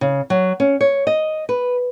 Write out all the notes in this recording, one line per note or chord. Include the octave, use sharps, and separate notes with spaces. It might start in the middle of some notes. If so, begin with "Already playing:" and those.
C#3
F#3
C#4
C#5
D#5
B4